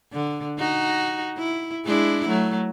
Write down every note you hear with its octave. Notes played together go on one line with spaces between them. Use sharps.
D3
D#4 F#4
E4
G#3 D4 E4
F#3 A3